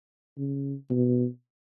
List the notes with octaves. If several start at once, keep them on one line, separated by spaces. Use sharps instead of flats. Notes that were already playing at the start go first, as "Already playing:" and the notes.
C#3
B2